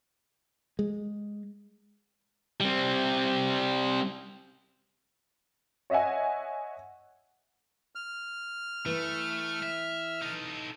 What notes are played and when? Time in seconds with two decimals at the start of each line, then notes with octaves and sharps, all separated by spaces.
0.79 G#3
2.60 G3 C4
5.90 C#5 D#5 E5 F#5 G#5
7.95 F6
8.86 E3 A3
9.63 E5
10.22 D#4 A4